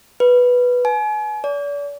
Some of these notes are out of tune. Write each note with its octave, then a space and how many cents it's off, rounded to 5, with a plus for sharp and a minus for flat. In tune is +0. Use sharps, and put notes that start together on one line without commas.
B4 -5
G#5 +35
D5 -40